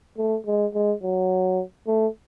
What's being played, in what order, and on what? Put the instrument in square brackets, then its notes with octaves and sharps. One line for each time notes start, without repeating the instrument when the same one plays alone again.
[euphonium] A3
G#3
G#3
F#3
A3